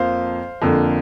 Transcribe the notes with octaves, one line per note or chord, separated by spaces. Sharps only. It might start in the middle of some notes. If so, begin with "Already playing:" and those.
Already playing: F2 F3 A#3 C5 F5
F2 D3 A#3